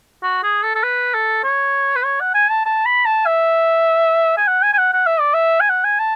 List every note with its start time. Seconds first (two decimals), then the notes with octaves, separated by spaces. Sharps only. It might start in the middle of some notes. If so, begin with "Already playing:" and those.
0.23 F#4
0.43 G#4
0.63 A4
0.75 A4
0.83 B4
1.14 A4
1.44 C#5
1.96 B4
2.04 C#5
2.20 F#5
2.35 G#5
2.51 A5
2.66 A5
2.86 B5
3.06 A5
3.26 E5
4.37 G#5
4.47 F#5
4.63 G#5
4.73 G#5
4.78 F#5
4.93 F#5
5.06 E5
5.20 D5
5.34 E5
5.61 G#5
5.69 F#5
5.84 G#5
5.99 A5